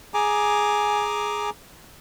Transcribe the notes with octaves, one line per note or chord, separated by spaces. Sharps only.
G#4 G#5 A#5 D6